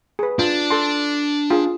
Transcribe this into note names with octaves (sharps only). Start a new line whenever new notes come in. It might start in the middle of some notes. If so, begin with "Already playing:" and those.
G#4 B4
D4 F4
A4 A5 C6
F4 G#4